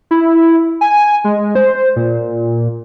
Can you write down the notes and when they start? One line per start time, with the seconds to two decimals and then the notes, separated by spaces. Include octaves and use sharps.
0.11 E4
0.81 G#5
1.24 G#3
1.55 C5
1.96 A#2